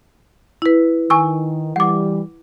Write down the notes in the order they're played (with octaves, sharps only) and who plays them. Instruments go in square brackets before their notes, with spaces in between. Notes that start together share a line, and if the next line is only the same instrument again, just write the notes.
[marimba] E4 B4
[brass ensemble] D#3 [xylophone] G#5 C#6 E6
[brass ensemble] E3 G3 [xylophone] F#5 D6